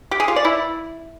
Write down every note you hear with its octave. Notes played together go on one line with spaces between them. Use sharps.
G4
G#4
F4
D5
E4